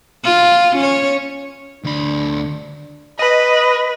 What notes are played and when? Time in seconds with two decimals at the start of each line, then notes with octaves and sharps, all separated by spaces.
0.24 F4
0.76 C#4 C#5
1.84 D2 D4 B5
3.19 B4 D#5